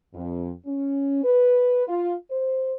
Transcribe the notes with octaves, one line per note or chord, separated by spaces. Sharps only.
F2
C#4
B4
F4
C5